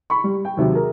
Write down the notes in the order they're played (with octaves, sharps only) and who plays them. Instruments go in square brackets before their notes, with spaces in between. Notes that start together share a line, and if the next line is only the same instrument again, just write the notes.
[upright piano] B5 C#6
G3
G5
D#2 C3 F#3
G#4 A#4